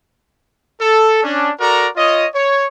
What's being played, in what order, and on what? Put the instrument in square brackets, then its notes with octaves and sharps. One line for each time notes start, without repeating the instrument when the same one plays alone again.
[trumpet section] A4
C#4 D4
F#4 A4 A#4 D5 A#5
F4 C#5 D#5
C#5